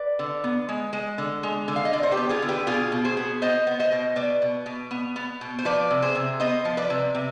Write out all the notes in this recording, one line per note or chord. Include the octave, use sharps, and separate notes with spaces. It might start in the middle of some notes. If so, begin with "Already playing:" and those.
Already playing: B4 D5
D3
B3
G#3
G#3
D3
G#3
D3
F5
D#5
D3 D5
C5
G4 B4
B3
F4 G#4
D3
G4 B4
B2 F4 G#4
B2
G#4 C5
B3
B3 C5 D#5
B3
C5 D#5
B2
B2 B4 D5
B2
B2
B3
B3
B2
C5
F3 B4 D5
C3
G#4 C5
C3
B3 C5 D#5
F3
B4 D5
C3
C3